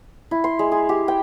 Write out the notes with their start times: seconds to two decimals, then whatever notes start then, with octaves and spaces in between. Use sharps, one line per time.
0.31 E4
0.44 C6
0.59 G#3
0.72 G#4
0.89 G4
1.08 G5